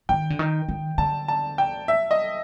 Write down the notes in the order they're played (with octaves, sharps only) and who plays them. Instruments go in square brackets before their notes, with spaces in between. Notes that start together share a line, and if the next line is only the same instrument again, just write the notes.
[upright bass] D#3 [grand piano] G5
[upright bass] D3
D#3
D#3
[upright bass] D3 [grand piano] A5
[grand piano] A5
G5
E5
D#5